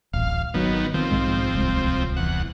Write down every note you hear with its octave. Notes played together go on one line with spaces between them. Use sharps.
D1 A1 F5
G#1 D#3 F#3 B3
D#3 F3 C4
B1 G#2 G#3
D1 C2 G#3
E2 F#5